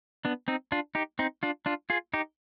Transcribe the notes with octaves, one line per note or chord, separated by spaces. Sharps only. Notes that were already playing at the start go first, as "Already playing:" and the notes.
B3 D4
C4 D#4
D4 F4
D#4 G4
C4 D#4
D4 F4
D4 F4
F4 G#4
D#4 G4